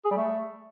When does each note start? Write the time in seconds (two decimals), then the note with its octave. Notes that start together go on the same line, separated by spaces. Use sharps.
0.05 G#4
0.11 G3
0.17 A3